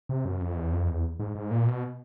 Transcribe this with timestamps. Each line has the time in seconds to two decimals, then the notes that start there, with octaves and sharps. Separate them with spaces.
0.09 C3
0.25 F#2
0.41 F2
0.57 E2
0.73 F2
0.88 E2
1.20 G#2
1.35 G#2
1.51 A#2
1.67 B2